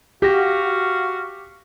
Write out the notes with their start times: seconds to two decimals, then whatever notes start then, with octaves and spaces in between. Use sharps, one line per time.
0.22 F#4 G4 F5 A#6